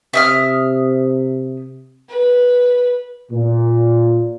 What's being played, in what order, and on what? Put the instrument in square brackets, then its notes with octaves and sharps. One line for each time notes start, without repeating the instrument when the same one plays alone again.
[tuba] C3 [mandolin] E5 D#6 F6
[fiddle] B4
[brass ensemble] A#2